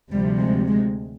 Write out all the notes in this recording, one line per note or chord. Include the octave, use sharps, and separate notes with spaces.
D2 C3 F3 G3
G#3
G#3